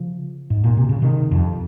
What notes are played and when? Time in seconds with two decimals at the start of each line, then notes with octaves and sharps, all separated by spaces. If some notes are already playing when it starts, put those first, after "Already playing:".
Already playing: C#3 F3
0.50 G#2
0.64 A#2
0.77 C3
0.89 C#3
1.02 C3 D#3
1.31 F2